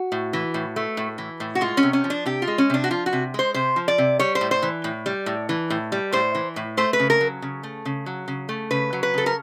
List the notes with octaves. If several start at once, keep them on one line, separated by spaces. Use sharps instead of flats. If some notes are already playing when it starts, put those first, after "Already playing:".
Already playing: F#4
A2
E3
A2
A3
A2
E3
A2
F#4
G#3 F4
C#4
C3
C#4
F3
D4
C3 G4
F4
G#3
C#4
C3 D4
F#4
F3 F4
F#4
C3
G#3 C5
C3 C5
F3
D5
C3
G3 C#5
C5
A2
C5
E3
A2
G3
A2
E3
A2
G3
A2 C5
E3
A2
A3 C5
B4
C#3
A#4
F#3
C#3
A3
C#3
F#3
C#3
A3
C#3 B4
F#3
B4
C#3 A4
A#4